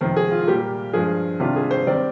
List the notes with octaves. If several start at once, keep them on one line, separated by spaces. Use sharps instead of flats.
F2 C3 D#3 C5
G#4
F4
F4
A#2 G3 A#3 G4
G2 F3 G#3 G#4
C3 D#3 G3 D4 F4
G#4
C5
D#3 G3 C4 D5